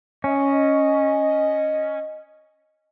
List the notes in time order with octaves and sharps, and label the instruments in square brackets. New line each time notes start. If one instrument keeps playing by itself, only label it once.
[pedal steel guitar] C#4 [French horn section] D#5